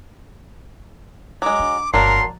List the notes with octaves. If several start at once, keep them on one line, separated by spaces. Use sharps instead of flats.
F#3 G#3 D6
D4
G1 G#2 F#3 A#3 D4 A#4 C6
F3